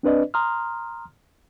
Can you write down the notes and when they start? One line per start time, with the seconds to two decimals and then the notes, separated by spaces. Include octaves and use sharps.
0.03 C4 D4 B4 D5 D#5
0.34 A#5 C6 D#6 F6